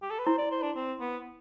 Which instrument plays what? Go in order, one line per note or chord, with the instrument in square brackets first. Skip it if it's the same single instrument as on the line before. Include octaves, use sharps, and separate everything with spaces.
[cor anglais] G4
A4
B4
[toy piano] E4 [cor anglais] C5
[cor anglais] D5
C5
D4
C4
B3